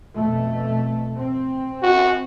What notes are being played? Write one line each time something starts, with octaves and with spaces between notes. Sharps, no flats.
F2 B2 A3
C4
F#4